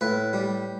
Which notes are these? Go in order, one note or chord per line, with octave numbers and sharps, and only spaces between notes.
A2 B4
G3